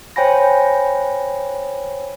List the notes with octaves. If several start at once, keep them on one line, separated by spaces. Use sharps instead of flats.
C5 C#5 G5 G#5 B5 A#6